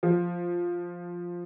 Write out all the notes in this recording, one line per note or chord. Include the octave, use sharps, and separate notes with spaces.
F3